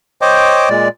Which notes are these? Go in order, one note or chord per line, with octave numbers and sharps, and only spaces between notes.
C5 C#5 D#5 G5 D6
A#2 G#3 D5